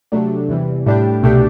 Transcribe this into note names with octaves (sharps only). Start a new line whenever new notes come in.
C3 F#3 A3 D4
E2 C3 E3 G3
A2 G3 D4 G4
C2 B2 A3 D4 G4